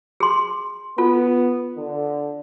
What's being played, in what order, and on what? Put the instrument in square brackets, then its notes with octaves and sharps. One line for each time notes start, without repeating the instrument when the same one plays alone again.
[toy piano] G#4 C6
[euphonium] B3 [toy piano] F4 A4
[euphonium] D3